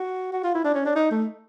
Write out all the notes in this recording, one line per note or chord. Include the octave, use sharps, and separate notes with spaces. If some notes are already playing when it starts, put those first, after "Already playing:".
Already playing: F#4
F#4
F4
E4
D4
C#4
D4
D#4
A3